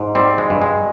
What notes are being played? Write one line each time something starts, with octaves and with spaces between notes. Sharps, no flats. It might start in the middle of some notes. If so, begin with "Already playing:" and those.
Already playing: G#2
G3 C4
G#3
G2
G#3